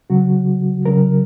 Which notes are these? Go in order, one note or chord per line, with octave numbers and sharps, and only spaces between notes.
C#3 F#3 F#4
C#3 F#3 A#4